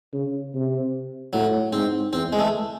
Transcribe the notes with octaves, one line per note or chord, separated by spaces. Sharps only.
C#3
C3
A2 F#3
G#2 C4
E2 C4
G#3
A3